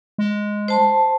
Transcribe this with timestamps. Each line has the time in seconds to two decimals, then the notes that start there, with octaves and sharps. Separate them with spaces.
0.18 G#3
0.68 C5 A5 C6